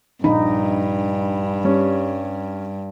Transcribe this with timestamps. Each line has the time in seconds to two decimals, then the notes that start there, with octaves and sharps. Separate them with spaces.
0.24 A#1 G2 D#4 B5
1.64 G3 C#4